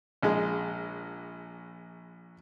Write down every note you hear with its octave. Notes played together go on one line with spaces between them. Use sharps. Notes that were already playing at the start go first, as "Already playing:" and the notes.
A#1 G#3